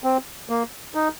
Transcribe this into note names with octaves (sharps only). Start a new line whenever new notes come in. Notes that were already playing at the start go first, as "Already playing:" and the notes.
C4
A#3
D#4